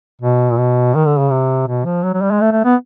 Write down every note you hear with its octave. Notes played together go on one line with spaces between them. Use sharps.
B2
A#2
B2
D#3
D3
C#3
C3
B2
F3
F#3
F#3
G3
G#3
A3
A3
B3